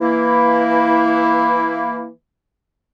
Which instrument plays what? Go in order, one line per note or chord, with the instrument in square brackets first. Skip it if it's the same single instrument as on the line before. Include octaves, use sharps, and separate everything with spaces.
[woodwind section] E3 A#3 E4